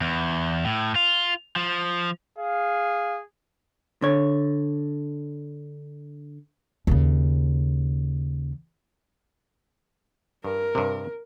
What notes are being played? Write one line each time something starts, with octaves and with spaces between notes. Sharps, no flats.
E2
A2
F4
F3
G#4 F5
D3 C#5
D#2 C#3
G2 A#4
G2 C3